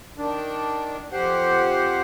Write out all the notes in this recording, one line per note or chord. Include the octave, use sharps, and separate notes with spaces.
D#3 D4
F2 G4 C5 F#5